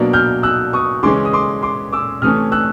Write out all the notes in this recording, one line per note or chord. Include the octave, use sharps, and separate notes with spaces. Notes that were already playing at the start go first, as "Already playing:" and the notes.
Already playing: B2 F#3 A#3 D4
F6 G6
E6 F#6
C#6 D#6
C#3 E3 G#3 C#4 C6 D6
D#6
C6 D6
C6 D6
D6 E6
C3 E3 A3 C#4 D#6 F6
E6 F#6